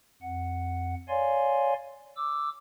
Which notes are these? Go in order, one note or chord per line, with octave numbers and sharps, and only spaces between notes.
F2 F#5
C#5 D5 F5 G#5 C6
D6 E6